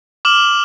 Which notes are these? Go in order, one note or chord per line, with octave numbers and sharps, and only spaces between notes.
D6 F6 E7 F#7